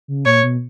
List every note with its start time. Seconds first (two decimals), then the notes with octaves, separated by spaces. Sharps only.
0.08 C#3
0.26 A#2 C#5
0.43 B2